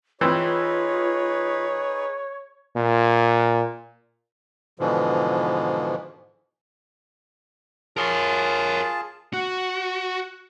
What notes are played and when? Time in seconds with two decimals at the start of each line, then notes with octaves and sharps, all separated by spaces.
0.21 E3 C4 D#4 F4 G#4 B4 C#5
2.77 A#2
4.79 G#2 B2 D3 E3 F3
7.97 F4 G#4 A#4 C#5 A5
9.33 F#4 F#5